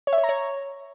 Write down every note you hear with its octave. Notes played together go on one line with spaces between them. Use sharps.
C#5
E5
C#5
A#5
C#5